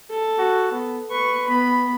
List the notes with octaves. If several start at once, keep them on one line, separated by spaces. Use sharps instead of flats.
A4
F#4
B3
B4 C#6
B3 B5